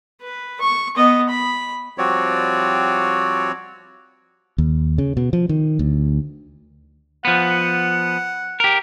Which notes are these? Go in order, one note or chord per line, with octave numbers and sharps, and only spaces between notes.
B4
C#6
B3 D#5
B5
F3 G3 C4 F#4 C#5 D5
D#2
C#3
B2
F3
D#3
D2
F3 B3 F#5
G4 A#4